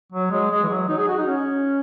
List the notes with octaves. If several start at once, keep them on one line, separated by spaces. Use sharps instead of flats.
F#3
G#3
G#3
E3
F#3
D#4
G#4
F#4
D#4
C#4